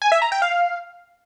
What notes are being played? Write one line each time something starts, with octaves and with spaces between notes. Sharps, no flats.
G#5
E5
A#5
G5
F5